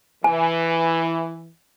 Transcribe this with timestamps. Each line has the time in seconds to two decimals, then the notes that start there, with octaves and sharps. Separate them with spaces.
0.24 E3 G#5